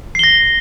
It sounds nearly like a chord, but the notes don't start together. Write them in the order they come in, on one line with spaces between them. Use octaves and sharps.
C7 G7 A#6